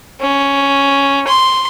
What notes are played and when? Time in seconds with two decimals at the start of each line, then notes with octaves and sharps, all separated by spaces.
0.21 C#4
1.27 C6